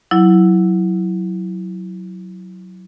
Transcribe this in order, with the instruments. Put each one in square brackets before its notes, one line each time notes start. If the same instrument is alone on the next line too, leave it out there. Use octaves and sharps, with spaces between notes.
[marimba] F#3 E4